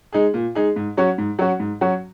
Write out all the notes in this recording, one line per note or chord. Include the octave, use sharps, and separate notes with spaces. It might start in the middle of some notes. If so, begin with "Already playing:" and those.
G#3 D#4 G#4
A#2
G#3 D#4 G#4
G#2
F#3 C#4 F#4
G#2
F#3 C#4 F#4
G#2
F#3 C#4 F#4